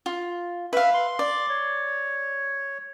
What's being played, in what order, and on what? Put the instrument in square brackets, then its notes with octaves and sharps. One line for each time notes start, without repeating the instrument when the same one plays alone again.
[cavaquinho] F4
[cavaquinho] B4 F5 [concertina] E5
[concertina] C6
[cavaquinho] D5
[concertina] C#5